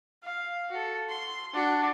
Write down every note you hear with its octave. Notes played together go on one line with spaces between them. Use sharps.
F5
F#4 A4
C6
D4 F#4